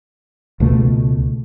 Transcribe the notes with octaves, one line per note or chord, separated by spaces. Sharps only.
C#2 B2 A3